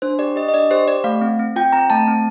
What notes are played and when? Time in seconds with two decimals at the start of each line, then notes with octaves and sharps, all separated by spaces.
0.02 D4 C5
0.19 G4 D5
0.36 G4 D#5
0.48 D#5
0.54 D4 D5
0.71 G4 C5
0.88 G4 D5
1.04 A3 F5
1.21 C4
1.39 C4
1.56 F4 G5
1.73 C4 A#5
1.90 A3 A5
2.08 C4